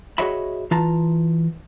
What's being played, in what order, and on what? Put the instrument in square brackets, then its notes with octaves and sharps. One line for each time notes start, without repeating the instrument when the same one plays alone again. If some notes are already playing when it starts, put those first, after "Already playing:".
[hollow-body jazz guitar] F#4 G#4 C#5 D#5 E5 B5
E3 F4 A5 A#5